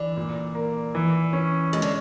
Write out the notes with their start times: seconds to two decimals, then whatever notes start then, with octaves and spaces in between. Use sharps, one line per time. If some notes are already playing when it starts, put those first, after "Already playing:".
Already playing: D3 E3
0.17 A#2
0.55 A#3
0.95 E3
1.33 C#4
1.73 D#3 G#3
1.82 D3